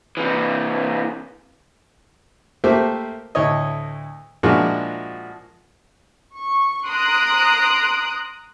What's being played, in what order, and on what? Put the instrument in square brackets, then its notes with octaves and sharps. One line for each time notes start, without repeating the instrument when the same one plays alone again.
[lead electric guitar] C3 E3
[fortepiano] A3 A#3 G4 C5 E5
D2 A2 C#5 D#5
A#2 F3 G#3 D4 E4 F#4
[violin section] C#6
A#5 C6 D#6 F#6 D7